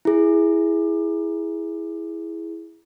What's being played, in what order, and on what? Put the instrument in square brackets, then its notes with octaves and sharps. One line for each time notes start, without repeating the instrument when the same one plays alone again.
[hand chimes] E4 G#4